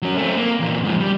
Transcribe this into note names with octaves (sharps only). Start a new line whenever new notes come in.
F#3 C#4
A3 C4
A#3
E2 A#2
G#2 F3
G3